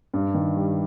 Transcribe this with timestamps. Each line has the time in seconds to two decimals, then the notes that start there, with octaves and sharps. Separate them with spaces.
0.14 G2
0.35 D#3
0.56 G3